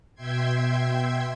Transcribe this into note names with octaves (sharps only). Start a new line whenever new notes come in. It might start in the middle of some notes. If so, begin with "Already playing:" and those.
B2 E5 G5 C6 G#6